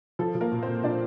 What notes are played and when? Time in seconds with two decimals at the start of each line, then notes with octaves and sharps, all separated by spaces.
0.19 F3 A4
0.35 F3
0.41 A#3 A#4
0.52 A#2
0.62 C4 C5
0.67 A#2
0.83 A#2 D4 D5